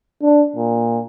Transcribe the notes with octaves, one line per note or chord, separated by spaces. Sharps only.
D4
A#2